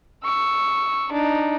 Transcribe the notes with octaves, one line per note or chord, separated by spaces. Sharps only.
C#6 E6
D4 D#4